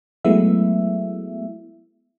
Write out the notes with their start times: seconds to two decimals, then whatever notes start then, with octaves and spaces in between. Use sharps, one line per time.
0.25 F#3 G#3 A3 B3 E4 E5